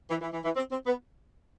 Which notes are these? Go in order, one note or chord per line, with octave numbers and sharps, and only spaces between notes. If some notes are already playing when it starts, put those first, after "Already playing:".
E3
E3
E3
E3
C4
C4
B3